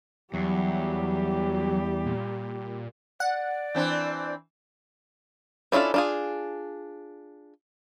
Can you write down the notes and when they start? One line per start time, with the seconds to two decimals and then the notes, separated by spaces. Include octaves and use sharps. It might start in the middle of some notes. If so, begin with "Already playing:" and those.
0.34 E2 F#3 G3 G4
2.06 A#2
3.20 D5 F#5
3.75 E3 C4 D4
5.72 C#4 D4 E4 F4 A4
5.94 D4 F4 G#4